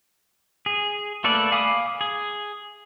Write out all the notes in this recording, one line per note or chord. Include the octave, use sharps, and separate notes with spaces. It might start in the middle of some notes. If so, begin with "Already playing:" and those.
G#4
A3 A#3 A4 B4 D5
F5 G#5 B5 D6 D#6
G#4